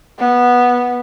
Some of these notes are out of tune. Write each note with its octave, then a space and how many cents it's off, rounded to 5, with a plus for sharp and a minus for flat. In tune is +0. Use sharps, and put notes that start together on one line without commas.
B3 -10